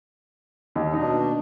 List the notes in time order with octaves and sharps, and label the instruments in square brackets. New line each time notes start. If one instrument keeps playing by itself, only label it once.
[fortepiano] D#2
[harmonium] B2 D4 [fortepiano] D#4